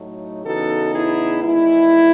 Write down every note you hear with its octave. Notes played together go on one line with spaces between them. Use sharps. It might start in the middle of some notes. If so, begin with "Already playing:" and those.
Already playing: A2 F#3 A3 D#4
E2 C#3 E3 B3 D#4 F#4 A4
E4 G#4
E2 D#3 G#3 E4